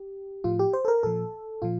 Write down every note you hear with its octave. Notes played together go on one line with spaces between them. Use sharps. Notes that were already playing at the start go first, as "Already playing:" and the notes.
Already playing: G4
A2 F3 F4
G4
C5
A4
A#4
A#2 F3 A4
A#2 F3 F4